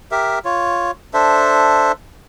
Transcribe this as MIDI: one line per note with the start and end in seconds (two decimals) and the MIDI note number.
0.11 0.39 67
0.11 0.39 70
0.11 0.39 76
0.45 0.91 65
0.45 0.91 73
1.14 1.92 62
1.14 1.92 69
1.14 1.92 72
1.14 1.92 76